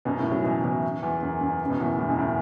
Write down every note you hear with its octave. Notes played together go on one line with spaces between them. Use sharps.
F#2 B2
A2 C#3
C#3 F#3
B2 E3
B2 E3
E2
F#2
F#2
C#3
F#2 B2
E2 A2
E2 A2
F#2 B2
A2 C#3